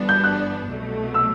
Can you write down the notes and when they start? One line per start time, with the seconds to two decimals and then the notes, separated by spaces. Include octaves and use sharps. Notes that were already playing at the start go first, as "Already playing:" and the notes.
Already playing: G1 G2 E3 B3 D4
0.09 G6
0.24 F#6
0.69 C2 B2 F#3 A3
1.14 E6